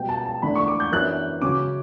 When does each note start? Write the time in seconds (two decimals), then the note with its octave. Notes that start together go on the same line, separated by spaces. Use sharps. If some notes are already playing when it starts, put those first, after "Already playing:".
Already playing: B2 G3 B3 G5
0.09 A5
0.26 A5
0.42 E2 D3 A3 D4 B5
0.55 C#6
0.68 D6
0.80 G6
0.92 F#2 E3 B3 D4 F#6
1.41 C#3 F#3 C#4 D6